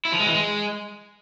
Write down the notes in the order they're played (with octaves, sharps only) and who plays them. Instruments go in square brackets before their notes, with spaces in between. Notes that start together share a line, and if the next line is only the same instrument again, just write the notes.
[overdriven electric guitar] E4
F3
G#3
E3
G#3